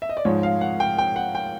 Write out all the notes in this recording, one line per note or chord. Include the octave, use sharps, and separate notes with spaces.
E5
D#5
D5
G#2 F3 G#3 C#5
F5
F#5
G5
G5
F#5
G5